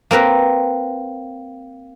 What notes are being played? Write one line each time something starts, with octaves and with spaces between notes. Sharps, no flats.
A#3 C4 A#4 B4